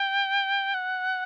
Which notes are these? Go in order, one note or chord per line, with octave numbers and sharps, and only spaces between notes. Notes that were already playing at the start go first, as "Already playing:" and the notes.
Already playing: G5
F#5